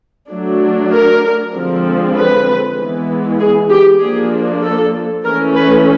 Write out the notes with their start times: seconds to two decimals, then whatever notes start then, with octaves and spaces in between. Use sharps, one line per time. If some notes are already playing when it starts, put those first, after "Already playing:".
0.30 F#3 A3 D4
0.92 A#4
1.54 D3 F3 G#3 C4
2.16 B4
2.78 E3 G#3 B3
3.40 G#4
3.69 G4
4.00 F3 A#3 D4 G#4
4.62 A4
5.24 E3 A3 C#4 A#4
5.55 B4